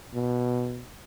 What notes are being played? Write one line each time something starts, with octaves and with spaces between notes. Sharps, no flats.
B2